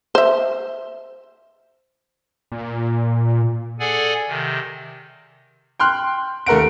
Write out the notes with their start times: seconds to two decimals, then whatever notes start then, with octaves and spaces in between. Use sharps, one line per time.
0.15 C5 E5
2.52 A#2
3.79 G#4 A4 D5 F#5 G#5
4.28 C3 D#3
5.80 G5 C6 F6 F#6
6.46 D#2 A3 A#4 F#5 D7